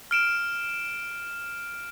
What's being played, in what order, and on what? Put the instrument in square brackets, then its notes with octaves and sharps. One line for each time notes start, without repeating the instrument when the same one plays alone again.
[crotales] F6 D7 E7